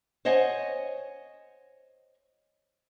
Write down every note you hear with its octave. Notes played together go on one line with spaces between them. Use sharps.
C5 C#5 D#5 F#5 G#5